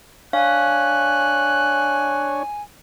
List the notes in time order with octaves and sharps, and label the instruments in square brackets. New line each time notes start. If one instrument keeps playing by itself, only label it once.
[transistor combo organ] D4 C#5 [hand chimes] F5 [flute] G#5 [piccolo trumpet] F#6